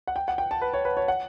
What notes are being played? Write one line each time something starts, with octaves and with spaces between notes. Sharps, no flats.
F#5
G5
F#5
G5
A5
B4
C#5
B4
C#5
F#5